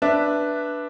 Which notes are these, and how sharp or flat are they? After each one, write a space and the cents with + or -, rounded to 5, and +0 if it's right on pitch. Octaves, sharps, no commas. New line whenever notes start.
D4 +0 B4 -5 E5 +0